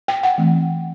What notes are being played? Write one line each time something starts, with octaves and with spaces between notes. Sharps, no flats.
G5
F#5
E3 A3 C4